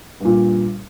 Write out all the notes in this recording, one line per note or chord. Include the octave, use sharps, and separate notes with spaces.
G2 A#2